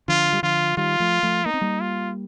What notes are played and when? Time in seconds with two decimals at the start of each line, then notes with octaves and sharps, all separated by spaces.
0.08 D3 F3 F4
0.33 G3
0.43 D3 F3 F4
0.77 D#3 G3 F4
1.00 F3 A3
1.23 F3 A3
1.46 A#3 D#4
1.54 C4
1.61 G3 A#3
1.80 F4